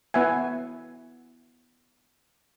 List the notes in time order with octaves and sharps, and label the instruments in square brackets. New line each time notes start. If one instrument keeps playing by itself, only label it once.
[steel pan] B3 E4 E5 F#5 G#5